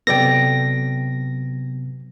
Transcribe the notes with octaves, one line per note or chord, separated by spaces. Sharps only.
C3 F#3 B3 A4 D5 G5 A#6